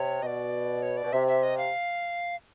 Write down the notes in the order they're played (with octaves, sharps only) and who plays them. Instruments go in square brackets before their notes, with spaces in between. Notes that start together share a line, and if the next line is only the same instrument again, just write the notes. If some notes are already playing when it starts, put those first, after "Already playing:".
Already playing: [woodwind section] C3 [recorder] C#5
[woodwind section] B2 [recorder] D5 D#5
[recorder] C#5
D5
[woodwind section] B2
[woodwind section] C3 [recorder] E5
[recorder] E5
D#5
F5